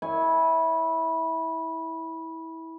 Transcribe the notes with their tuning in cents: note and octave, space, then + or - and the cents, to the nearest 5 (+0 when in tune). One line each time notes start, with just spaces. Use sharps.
E4 -20 C#5 +0 G#5 +0